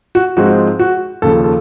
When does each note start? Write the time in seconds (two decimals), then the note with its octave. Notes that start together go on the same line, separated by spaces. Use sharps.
0.15 F#4
0.36 G#2 F3 G#3 C4 D#4 F#4
0.79 F#4
1.22 D#2 C#3 F3 A4
1.44 A4